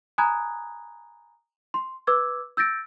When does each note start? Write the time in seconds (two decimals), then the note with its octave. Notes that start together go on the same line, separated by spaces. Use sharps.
0.18 G#5 A#5 B5 D#6 F#6 G#6
1.74 C6
2.07 B4 D6 E6 G#6
2.57 E6 G6 A6 A#6 D7